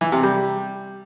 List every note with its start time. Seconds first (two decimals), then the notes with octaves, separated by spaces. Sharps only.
0.01 E3
0.12 C3
0.23 G3